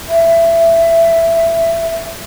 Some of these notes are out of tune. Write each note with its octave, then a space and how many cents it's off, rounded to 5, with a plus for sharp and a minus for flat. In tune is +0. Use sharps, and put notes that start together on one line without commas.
E5 +15